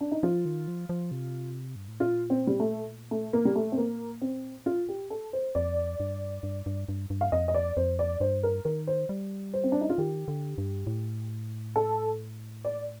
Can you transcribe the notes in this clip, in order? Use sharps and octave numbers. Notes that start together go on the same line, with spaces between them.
D4
D#4
F3 F4
D#3
F3
F3
C3
G2
A2
A#2 F4
C4
G3
A3
A3
A#3
G3
A3
C4
A#3
C4
F4
G4
A4
C5
F2 D5
G2
G2
G2
G2
G2
F5
F2 D#5
D#5
D5
F2 C5
D5
G2 C5
A#4
D#3 A#4
C5
G3
C5
C4
D4
D#4
F4
D#3 G4
D3
G2
A2
A4
D5